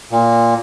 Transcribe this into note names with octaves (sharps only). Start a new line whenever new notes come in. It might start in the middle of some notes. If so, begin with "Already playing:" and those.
A#2